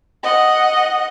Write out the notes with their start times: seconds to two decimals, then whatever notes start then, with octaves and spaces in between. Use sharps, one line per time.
0.23 D#5 F#5